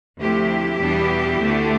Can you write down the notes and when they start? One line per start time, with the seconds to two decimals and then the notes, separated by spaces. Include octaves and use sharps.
0.21 D2 C3 F3 A3 E4 G4
0.81 E2 B2 G3 B3 D4
1.41 D2 D3 A3 D4